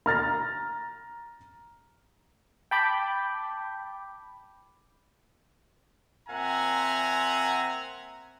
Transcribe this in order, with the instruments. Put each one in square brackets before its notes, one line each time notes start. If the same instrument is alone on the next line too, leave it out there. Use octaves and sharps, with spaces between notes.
[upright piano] A#5 F6 A6 A#6
[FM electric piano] G5 A5 B5 D6 G6
[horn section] A#2 C4 E5 F#5 G#5 A#5